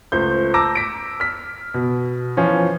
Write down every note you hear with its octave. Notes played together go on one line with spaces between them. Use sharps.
C#2 A3 C5 G6
A5 A#5 D6 E6 A#6
B6 D7
F6 B6
B2
E3 F3 C#4 F4